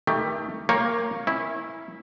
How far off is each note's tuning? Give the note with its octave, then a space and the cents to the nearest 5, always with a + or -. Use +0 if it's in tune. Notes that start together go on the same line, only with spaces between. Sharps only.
D#3 +30 A3 +20 G4 +20
A#3 +0 C#5 -5 G5 +30
C#4 -25 E4 -10